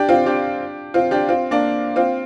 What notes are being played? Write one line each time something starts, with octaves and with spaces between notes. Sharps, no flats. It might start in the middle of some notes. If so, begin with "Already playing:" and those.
Already playing: D4 G4
C4 F4
D4 G4
C4 F4
D4 G4
C4 F4
A#3 D4
C4 F4